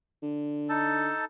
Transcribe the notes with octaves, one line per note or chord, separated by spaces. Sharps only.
D3
D#4 A4 A5